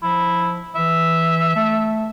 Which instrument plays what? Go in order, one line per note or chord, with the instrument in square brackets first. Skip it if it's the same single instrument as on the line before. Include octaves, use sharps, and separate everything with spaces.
[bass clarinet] F3 [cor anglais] E4
[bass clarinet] E3 [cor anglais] E5
[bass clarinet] A3